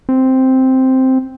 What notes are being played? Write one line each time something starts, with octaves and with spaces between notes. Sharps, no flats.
C4